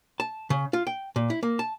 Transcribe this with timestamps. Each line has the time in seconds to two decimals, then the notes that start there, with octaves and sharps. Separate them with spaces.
0.20 A5
0.50 C#3
0.73 F4
0.87 G5
1.16 A#2
1.30 E4
1.43 A#3
1.59 A5